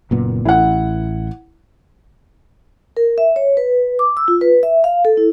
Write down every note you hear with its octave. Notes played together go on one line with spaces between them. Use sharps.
F#1 A#2 B3
A1 E4 F#5
A#4
E5
C#5
B4
D6
E6
F4
B4
E5
F5
A4
E4